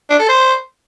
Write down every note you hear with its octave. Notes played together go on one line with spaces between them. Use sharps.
D4
A4
C5